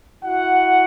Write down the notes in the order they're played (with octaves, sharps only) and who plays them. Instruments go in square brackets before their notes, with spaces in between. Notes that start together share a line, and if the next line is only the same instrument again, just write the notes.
[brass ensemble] E4 F#4 F#5